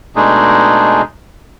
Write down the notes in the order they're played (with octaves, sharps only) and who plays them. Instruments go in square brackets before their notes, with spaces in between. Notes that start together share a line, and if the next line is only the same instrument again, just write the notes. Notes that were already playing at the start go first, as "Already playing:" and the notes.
[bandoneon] B2 G#3 A3 D4 D#4 G#4